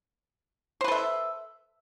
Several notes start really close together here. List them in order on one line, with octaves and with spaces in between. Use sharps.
C5 B4 A4 E5